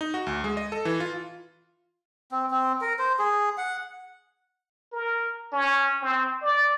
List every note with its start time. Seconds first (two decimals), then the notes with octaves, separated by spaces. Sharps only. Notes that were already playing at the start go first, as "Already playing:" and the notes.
0.01 D#4
0.14 F#4
0.27 D2
0.44 G#3
0.57 D#5
0.72 A4
0.85 E3
1.00 F4
2.32 C4
2.51 C4
2.81 A#4
2.99 C5
3.19 G#4
3.58 F#5
4.92 A#4
5.52 C#4
6.02 C4
6.42 D5